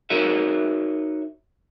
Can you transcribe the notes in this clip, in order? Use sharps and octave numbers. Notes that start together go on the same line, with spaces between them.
D#4 F#4 A#4 C#5 E5